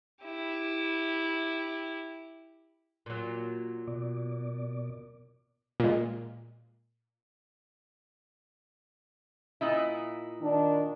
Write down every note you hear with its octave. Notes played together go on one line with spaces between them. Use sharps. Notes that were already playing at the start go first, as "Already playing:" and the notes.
E4 G4
A#2 F#3
B2 D5
A#2 G#3
A#2 D#4 E4
D#3 D4